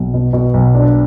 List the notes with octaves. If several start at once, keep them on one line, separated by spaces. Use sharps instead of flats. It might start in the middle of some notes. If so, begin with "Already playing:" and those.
Already playing: B1
B2
B2
B1
D4